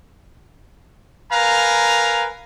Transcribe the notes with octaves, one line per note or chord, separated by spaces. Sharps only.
A#4 B4 F5 G#5 A#5